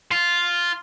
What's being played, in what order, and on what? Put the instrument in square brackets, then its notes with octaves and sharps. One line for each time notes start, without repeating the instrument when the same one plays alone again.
[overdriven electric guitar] F4